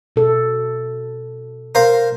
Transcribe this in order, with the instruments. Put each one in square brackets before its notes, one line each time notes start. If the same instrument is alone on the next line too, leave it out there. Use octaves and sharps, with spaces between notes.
[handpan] B2 A4
[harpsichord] A#4 C5 F5